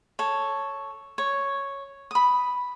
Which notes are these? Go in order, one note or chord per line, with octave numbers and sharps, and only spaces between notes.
A4 C#5
C#5
B5 D#6